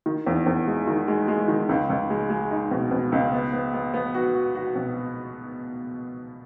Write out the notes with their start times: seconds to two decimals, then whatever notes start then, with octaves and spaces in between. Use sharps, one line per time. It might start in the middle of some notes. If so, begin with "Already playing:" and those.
0.06 D#3
0.27 E2
0.46 E2
0.67 G#3
0.87 D#3
1.08 G#3
1.28 G#3
1.48 D#3
1.69 C#2
1.90 C#2
2.10 G#3
2.30 G#3
2.51 D#4
2.71 B2
2.91 B2
3.12 C#2
3.32 B3
3.53 B3
3.74 B3
3.94 B3
4.14 F#4
4.34 F#4
4.55 F#4
4.75 B2